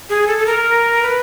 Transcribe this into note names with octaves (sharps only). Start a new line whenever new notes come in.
G#4
A4
A4
A#4
B4